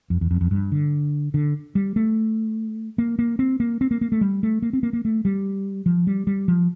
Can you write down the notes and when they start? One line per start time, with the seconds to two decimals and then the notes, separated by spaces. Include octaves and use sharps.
0.10 F2
0.21 E2
0.31 F2
0.41 F2
0.51 G2
0.72 D3
1.34 D3
1.75 G3
1.96 A3
2.98 A#3
3.19 A#3
3.39 C4
3.60 A#3
3.81 C4
3.91 A#3
4.01 A#3
4.12 A3
4.21 G3
4.43 A3
4.62 A#3
4.73 C4
4.83 A#3
4.93 A#3
5.05 A3
5.25 G3
5.86 F3
6.07 G3
6.27 G3
6.48 F3